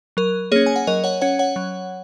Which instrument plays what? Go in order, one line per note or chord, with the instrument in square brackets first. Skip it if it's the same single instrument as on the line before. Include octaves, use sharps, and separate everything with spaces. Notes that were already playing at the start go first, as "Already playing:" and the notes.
[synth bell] F#3 A#4
A#3 C#4 G#4 C#5
G#5
F#5
F#3 A#4 D#5
C#5 F#5
C#4 C#5 F#5
C#5 F#5
F#3